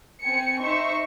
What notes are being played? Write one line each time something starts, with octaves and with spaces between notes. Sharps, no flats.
C4 G#5 C#7
D#4 C5 E5 C#6